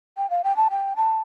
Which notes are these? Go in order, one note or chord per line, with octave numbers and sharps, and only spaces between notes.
G5
F5
G5
A5
G5
A5